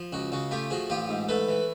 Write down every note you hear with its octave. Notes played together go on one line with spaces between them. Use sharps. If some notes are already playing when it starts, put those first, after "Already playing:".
Already playing: F3
C#2 F#4
C#3 F#4
A3 F4 G4
F3 F#4 G#4
A1 F4 G4
G#2
A3 A4 B4
E3